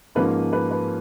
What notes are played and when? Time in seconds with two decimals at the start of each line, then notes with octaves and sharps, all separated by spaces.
0.15 G#2 F3 A#3 C#4 B4
0.53 B4
0.71 B4